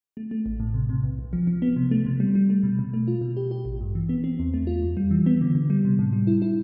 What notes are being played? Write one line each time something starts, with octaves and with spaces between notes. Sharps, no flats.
A3
A3
A1
A2
C3
C3
B1
B1
F3
F3
B3
C3
A3
C3
G3
G3
A3
B2
B2
A3
F4
B2
G4
G4
A1
G2
E3
B3
C4
E2
A3
F4
F2
G3
E3
B3
D3
D3
G3
C3
A2
G3
E4
E4